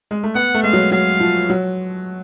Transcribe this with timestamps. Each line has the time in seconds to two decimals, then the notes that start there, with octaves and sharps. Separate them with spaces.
0.11 G#3
0.23 A3
0.35 B3 F#5
0.55 A3
0.63 G#3 F5
0.73 F#3
0.92 F#3 F5
1.20 F3
1.50 F#3